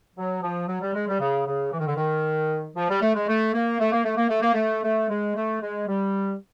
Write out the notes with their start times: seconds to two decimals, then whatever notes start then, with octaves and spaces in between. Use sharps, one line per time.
0.16 F#3
0.42 F3
0.68 F#3
0.81 G3
0.94 G#3
1.08 G3
1.20 C#3
1.46 C#3
1.72 E3
1.80 D#3
1.87 D3
1.96 D#3
2.76 F3
2.89 G3
3.02 A3
3.15 G#3
3.28 A3
3.54 A#3
3.80 A3
3.92 A#3
4.04 A3
4.17 A#3
4.30 A3
4.42 A#3
4.54 A3
4.84 A3
5.09 G#3
5.36 A3
5.62 G#3
5.87 G3